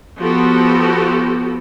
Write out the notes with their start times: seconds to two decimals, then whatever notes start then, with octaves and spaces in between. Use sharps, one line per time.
0.20 F3 B3 F#4 G4 A4